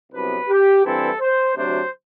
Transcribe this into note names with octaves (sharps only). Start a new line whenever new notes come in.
C2 C3 F#3 B3 D4 B4
G4
G2 E3 G3 C4 E4 A4
C5
D2 C3 F#3 A3 D4 C5